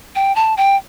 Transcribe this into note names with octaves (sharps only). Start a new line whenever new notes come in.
G5
A5
G5